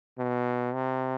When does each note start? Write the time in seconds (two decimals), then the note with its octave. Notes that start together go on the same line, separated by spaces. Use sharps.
0.18 B2
0.74 C3